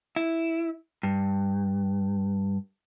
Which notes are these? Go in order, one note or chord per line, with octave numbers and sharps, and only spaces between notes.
E4
G2